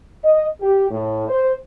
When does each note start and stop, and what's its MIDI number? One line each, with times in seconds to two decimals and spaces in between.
0.24 0.46 75
0.61 0.85 67
0.91 1.27 45
1.28 1.52 72